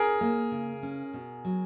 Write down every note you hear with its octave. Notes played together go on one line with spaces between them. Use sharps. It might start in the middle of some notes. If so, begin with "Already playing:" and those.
Already playing: C#4 G#4 A#4
A#3
C#3
C#4
B2
F#3